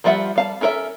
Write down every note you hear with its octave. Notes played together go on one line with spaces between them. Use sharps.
F3 G3 F4 E5 F#5
G3 F5 A5
C#4 A4 A#4 D5 E5